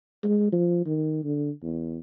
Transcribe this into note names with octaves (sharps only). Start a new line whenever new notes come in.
G#3
F3
D#3
D3
E2